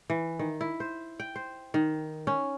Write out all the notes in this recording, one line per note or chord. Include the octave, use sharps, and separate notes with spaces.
E3
D#3
E4
C5
G5
C5
D#3
C#4